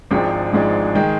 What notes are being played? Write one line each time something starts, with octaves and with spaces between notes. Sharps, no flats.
G#1 G#2 F3 G#3 D4 G5
G#1 G#2 F3 G#3 D4
D#3 G#3 G5